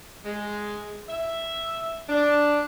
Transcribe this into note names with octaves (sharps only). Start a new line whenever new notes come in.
G#3
E5
D4